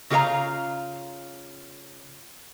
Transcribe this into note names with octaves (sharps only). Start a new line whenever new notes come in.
C#3 F4 G4 C#5 F5 A#5